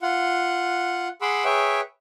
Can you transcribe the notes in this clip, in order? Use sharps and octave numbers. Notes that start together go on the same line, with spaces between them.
F4 F#5
G#4 F#5 B5 C6 D6 E6
G#4 B4 C#5 E5 G5